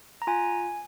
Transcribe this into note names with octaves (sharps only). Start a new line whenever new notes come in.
A#5
F4 G#5